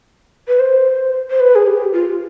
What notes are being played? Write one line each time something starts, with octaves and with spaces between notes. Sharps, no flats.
B4
C5
C5
B4
G#4
G4
F4